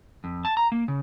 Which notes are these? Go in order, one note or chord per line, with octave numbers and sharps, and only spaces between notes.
F2
A5
A#5
A#3
C#3